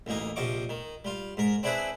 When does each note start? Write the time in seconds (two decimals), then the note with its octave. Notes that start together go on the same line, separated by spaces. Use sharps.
0.06 A1 D2 A#3 D#4 D#5
0.36 A#1 C3 F3 D#5 C#6 D6
0.69 D#3
1.05 G3 F4
1.37 G#2 A#4
1.63 C4 D4 E4 G#4 B4 C5